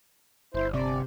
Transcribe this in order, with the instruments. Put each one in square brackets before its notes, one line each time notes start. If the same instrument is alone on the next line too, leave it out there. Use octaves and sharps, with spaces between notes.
[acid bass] G1 [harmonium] E4 C5
[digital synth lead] C3 [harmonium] D5